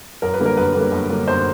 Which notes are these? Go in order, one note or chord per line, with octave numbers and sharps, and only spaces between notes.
F#2 A#4
B4
D3 G3 A#3
A#4
F#2 B4
D3 G3 A#3
F#2
D3 G3 A#3
F#2 C5